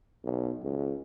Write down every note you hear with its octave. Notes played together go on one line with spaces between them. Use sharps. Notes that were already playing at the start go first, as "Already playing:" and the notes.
B1
C#2